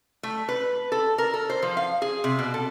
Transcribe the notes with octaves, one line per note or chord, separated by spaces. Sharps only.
A3
B4
A4
A#4
A4
C5
F3
F5
G#4
C3
B2
A4